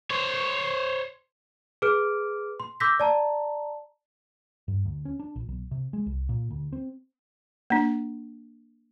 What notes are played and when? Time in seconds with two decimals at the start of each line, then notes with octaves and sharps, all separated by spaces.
0.10 C5 C#5
1.82 G#4 B4 D6 F6 D7
2.60 C6
2.80 C6 D6 E6 G6 A#6 B6
3.00 D5 A5 A#5
4.68 G2
4.85 D2
5.05 C#4
5.20 D4
5.36 A#1
5.49 B1
5.71 C3
5.93 G#3
6.06 C2
6.29 A#2
6.51 D2
6.73 C4
7.70 A#3 D4